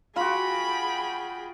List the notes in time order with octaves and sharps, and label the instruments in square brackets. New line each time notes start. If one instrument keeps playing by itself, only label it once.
[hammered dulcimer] F4 F#4 [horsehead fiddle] G#4 G5 [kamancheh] B5